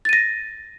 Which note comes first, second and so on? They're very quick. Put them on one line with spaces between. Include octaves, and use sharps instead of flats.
A6 D#7 A#6